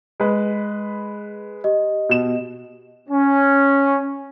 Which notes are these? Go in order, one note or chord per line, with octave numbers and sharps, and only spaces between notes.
G#3 B4
G4 D#5
B2 E7
C#4